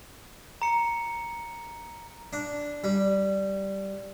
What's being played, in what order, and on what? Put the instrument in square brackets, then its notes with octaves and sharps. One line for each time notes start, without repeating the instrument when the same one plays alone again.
[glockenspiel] A#5 C#7
[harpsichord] D4
G3